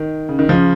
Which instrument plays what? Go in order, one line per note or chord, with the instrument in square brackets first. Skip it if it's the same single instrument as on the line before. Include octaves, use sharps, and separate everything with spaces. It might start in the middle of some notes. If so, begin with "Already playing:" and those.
Already playing: [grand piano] D#3
C#3
D#3
C#3 F3